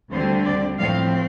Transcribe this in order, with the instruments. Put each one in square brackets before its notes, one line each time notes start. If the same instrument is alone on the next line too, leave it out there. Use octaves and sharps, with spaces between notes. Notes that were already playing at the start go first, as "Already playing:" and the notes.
[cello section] D2 D3 G3 C4 C5
D5
A2 F3 C4 F5